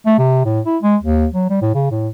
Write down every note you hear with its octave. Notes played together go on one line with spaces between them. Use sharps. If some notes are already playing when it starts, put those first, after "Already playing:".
A3
C3
A2
E4
G#3
D#2
F#3
G3
A2
C#3
A2